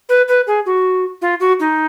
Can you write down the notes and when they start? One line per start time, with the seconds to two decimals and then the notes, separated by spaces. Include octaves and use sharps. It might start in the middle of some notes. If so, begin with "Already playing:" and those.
0.09 B4
0.28 B4
0.47 G#4
0.66 F#4
1.22 F4
1.40 F#4
1.60 D#4